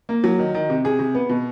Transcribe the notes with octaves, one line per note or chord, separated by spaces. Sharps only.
A#3
F#3
D#3
D#3
C3
C3 G#4
C3
B3
B2